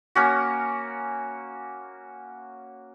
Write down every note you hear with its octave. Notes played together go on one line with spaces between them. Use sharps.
A#3 C#4 F#4